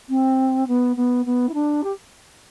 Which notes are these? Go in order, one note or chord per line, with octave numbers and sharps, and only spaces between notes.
C4
B3
B3
B3
E4
D4
G4